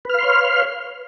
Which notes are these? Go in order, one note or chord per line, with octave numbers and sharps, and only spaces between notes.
B4 C#5 F5 C6 F6